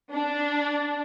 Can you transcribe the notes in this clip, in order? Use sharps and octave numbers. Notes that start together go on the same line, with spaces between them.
D4